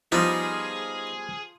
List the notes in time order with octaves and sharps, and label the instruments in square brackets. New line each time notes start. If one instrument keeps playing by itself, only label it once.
[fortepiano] F3 [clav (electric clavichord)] G3 B3 [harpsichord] D#4 [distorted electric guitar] G#4 G#5